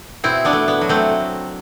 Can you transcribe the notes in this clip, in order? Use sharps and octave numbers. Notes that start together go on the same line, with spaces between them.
B2 C4 E4
B3 D4
A3
B3
F#3
A3 C4